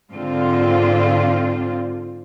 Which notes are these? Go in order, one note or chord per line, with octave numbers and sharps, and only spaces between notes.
G#2 D3 C4 F4